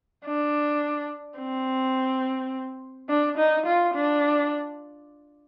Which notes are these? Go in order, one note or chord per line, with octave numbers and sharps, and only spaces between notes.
D4
C4
D4
D#4
F4
D4